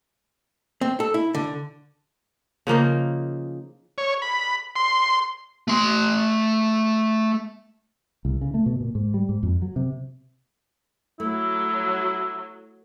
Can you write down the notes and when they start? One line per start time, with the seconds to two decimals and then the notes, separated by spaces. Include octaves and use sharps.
0.81 C4
1.00 A4
1.14 E4
1.34 D3
2.67 C#3 F3 A#3 D#4
3.98 C#5
4.22 B5
4.76 C6
5.68 A3 C6
8.25 C2
8.41 C#3
8.54 A3
8.66 B2
8.81 A#2
8.95 G#2
9.14 G3
9.29 G#2
9.43 F2
9.62 F#3
9.76 C3
11.20 F#3 A3 E4